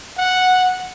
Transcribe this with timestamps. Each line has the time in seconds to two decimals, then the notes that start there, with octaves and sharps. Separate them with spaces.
0.18 F#5